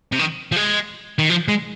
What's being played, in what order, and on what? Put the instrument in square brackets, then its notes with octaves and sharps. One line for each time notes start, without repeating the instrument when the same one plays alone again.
[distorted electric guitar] C3
D#3
F3
G#3
D#3
F3
G#3